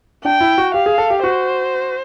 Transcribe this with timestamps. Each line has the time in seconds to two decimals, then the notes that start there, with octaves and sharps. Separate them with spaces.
0.25 D4 G5
0.40 E4
0.58 F#4
0.74 G4 F5
0.86 G#4
0.98 A4
1.10 G4
1.24 F#4 C5